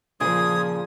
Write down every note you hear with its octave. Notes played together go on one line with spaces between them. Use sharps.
A#2 C#3 F3 G#4 D#6 G#6